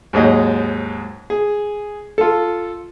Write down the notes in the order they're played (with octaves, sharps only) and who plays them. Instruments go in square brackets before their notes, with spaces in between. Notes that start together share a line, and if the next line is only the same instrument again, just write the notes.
[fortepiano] D#2 G#2 F#3 D#5
G#4
F4 A4